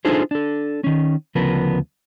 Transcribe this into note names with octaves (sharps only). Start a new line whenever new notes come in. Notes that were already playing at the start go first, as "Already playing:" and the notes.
D4 D#4 F4 G#4 A4 C5
D4 A4
D#3 C#4
D2 C#3 F3 B3 A#4 B4